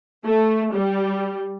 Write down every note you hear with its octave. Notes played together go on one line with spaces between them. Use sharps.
A3
G3